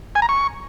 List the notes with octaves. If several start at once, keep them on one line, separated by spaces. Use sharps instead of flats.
G#5
A#5
C#6